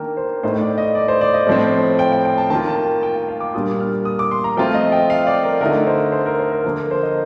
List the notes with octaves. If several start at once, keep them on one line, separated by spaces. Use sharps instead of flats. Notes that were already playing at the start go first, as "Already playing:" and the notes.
Already playing: D#3 A#3 D4 A#4 G5 A5
C5
A2 A3 D#4 C5
D5
D#5
D5
C5
D5
D#5
A2 F3 C4
G5
G5
G5
A5
D#3 A#3 F4 A5
A5
G5
G5
G5
F5
D6
A#2 G3 A#3 D4 F4 D#6
F6
D#6
D6
C6
A#5
F3 A3 C4 F4 G5
D#5
G5
F5
D5
A#4
D3 A3 D#4 A#4
C5
C5
A#4
C5
A#4
D3 F3 A#3 A#4
A#4
C5
D#5